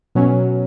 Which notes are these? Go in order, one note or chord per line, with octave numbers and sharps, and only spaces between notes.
B2 F#3 C#4